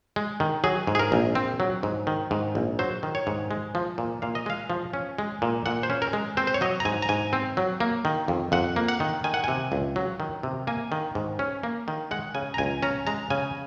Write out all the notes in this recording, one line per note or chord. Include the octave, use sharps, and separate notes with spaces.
G#3
D#3
F#3 G#4
G#2
G#4
A#4
A#1
C4
F#3
G#2
D#3
G#2
A#1
F#3 C5
D#3
C#5
G#2
G#3
F3
A#2
A#2 F5
D#5
G#3 F5
F3
C#4
G#3
A#2
A#2 F#5
C5
C#4
A#4
G#3
C4 C5
C5
C#5
F#3 D#5
A#5
G#2 G#5
A#5
G#2 G#5
C4
F#3
A#3
D#3
F2
F2 F#5
A#3
F#5
D#3
D#3 G#5
F#5
C3 G#5
C#2
F#3
D#3
C3
A#3 G#5
D#3
G#2
C#4
A#3
D#3
G#3 F#5
C#3 G#5
A#5
C#2 G#5
C#4 A#5
G#3 A#5
C#3 G#5